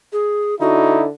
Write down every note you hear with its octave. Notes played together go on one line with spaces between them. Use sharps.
G#4
D3 D#4 E4 F#4